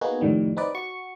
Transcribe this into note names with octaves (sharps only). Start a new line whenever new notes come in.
A#3 B3 D#4 F#4 G#4
F2 A2 D#3 G3
C4 D#4 B4 D5
F#4 C#6